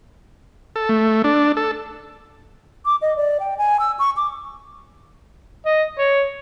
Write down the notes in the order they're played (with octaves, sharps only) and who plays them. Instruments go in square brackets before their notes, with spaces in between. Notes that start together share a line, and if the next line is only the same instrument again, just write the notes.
[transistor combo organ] A4
A3
D4
A4
[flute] D6
D#5
D5
G5
G#5
E6
C#6
D6
[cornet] D#5
C#5